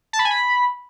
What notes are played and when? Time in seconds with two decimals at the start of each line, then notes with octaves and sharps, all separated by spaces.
0.13 A5
0.19 B5
0.25 G#5
0.31 B5